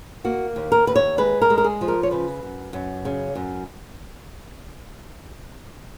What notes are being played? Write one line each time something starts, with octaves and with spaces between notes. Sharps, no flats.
A#3 F#4
D#2
A#4
D#2 B4
C#5
G#3 B4
A#4
G#3
A#4
G#4
F3
A#4
C#5
C#3 B4
F#2
F#2
C#3
F#2